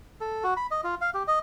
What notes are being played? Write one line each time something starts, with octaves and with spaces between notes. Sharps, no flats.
A4
F#4
B5
D#5
F4
F5
G4
D#5